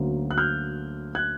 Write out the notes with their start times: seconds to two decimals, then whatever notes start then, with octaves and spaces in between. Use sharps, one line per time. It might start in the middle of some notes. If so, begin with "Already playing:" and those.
Already playing: D2 D3 F#3 A#3 C#4
0.31 F#6
0.38 F6 G6
1.15 F#6 G#6